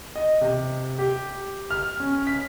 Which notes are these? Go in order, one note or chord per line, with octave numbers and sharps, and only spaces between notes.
D#5
C3
G4
F6
C#4
B6